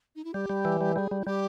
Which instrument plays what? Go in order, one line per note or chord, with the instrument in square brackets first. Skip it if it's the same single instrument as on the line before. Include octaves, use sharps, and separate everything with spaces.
[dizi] D#4
E4
[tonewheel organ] G3 [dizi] G4
[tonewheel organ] G3
E3
G3
[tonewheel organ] G3 [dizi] G#4
[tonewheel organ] G3
[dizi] E4
[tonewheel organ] G3 [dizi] G4